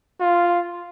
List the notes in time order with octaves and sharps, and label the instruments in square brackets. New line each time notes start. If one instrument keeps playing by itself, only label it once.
[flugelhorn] F4